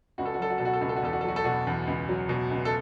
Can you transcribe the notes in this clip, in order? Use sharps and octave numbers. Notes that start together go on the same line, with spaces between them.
C#2 F#4
A4
F#4
F#3 A4
F#4
B2 A4
F#4
A4
C#2 F#4
A4
F#4
E2 A4
F#4
A4
F#3 F#4
A4
B2 F#4
E2
C#2
F#3
B2
C#2
A4